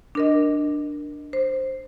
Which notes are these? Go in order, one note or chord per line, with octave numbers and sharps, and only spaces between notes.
D4 A#4 D#5
C5